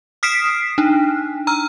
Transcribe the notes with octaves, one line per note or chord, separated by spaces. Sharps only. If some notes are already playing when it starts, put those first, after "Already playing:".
D#6 F6 B6 C7 D7 E7
D4 D#4
A#5 E6 F6